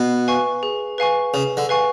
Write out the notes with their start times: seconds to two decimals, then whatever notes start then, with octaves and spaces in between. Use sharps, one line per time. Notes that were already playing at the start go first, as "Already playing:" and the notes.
Already playing: B2
0.28 B4 F5 G#5 C#6
0.63 G#4
0.98 B4 F5 G#5 C#6
1.34 C#3 G#4
1.57 D3
1.69 B4 F5 G#5 C#6